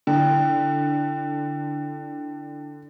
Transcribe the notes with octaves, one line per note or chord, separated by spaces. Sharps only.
D3 E4 G5